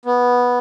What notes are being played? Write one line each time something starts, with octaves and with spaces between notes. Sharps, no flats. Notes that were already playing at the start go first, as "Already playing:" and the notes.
B3